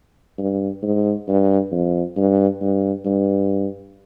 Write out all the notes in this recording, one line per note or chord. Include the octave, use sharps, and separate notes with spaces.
G2
G#2
G2
F2
G2
G2
G2